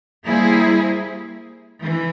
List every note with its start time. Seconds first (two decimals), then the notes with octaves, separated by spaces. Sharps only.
0.24 G3 A#3 E4 G#4 C5
1.82 E3